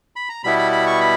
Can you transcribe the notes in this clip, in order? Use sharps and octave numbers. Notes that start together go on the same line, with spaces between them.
B5
A#5
B2 G3 B3 E4 B5
B5
B5
C#6
B5